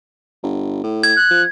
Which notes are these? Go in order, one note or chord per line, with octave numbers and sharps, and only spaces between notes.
G1
A2
G#6
F#6
F3